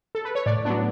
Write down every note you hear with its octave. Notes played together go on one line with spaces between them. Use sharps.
A4
B4
C#5
A2 D5
F#3 B3 D4